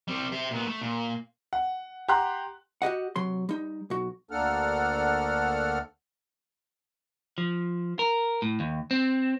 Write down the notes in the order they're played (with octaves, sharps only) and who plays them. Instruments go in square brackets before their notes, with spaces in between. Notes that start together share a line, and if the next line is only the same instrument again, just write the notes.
[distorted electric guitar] G3 C4
C5 E5
A#2 B3
A3
A#2
[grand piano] F#5
G4 F#5 A#5 C6 F#6
[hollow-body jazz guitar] F#4 G4 D#5 F#5
C3 F#3 C6
G3 D#4
B1 F#4
[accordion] D2 A#3 D4 A4 F#5 F6
[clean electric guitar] F3
A#4
A2
D#2
C4